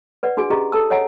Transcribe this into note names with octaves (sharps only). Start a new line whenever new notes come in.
B4 D5 F#5
D4 F#4 G#4 G#5
C#4 F4 G4 G#4 D#5 A#5
A4 A5 E6
C#5 D#5 F#5 G#5 A#5